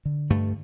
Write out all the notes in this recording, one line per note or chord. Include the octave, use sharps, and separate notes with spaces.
D3
G2 A3